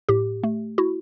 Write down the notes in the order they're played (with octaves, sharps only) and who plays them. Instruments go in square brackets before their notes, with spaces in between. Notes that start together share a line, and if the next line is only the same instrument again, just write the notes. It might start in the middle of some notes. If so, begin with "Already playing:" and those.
[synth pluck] A2 G4
A3
E4 F#4